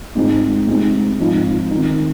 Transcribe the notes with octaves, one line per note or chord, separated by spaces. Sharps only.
G#2 G#3 C4 D#4
C3 G#3 C4 D#4
G#2 F3 C4 D#4
D#3 C4 D#4